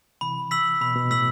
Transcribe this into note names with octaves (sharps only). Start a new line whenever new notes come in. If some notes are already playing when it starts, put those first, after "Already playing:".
C3 E3 B5
E6 B6 F#7
B2 B5
B2
A2 E6 B6 F#7